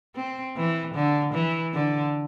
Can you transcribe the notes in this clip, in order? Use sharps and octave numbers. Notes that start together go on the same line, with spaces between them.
C4
E3
D3
E3
D3